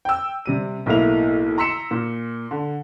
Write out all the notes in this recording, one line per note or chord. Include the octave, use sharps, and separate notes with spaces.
G5 E6
C3 G3 D#7
B1 A2 A#3 E4 F7
A#5 C6 E6 B6 C#7 E7
A#2
D3